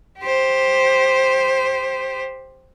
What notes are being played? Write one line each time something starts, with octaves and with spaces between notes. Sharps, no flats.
G4 C5